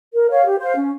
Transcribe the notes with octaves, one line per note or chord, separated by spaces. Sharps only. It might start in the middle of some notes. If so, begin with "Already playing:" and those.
A#4
C#5 F5
G4
C5 F5
C#4